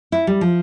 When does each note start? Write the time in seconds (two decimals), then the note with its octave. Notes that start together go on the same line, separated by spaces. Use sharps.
0.12 E4
0.27 G3
0.41 F3